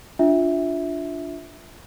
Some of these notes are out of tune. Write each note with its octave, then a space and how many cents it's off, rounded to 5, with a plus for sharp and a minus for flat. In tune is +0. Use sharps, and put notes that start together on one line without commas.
D4 +0 F4 +0 E5 -10